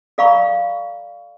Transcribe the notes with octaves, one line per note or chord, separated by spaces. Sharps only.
A4 D5 F5 A#5 B5 C#6